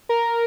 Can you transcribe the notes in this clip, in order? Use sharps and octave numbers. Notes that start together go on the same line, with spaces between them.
A#4